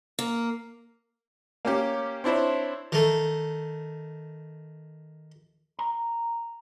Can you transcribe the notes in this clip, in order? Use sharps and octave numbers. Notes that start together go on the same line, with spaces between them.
A#3
A#3 C#4 G4
C4 D4 E4 C5 C#5
D#3 A3
A#5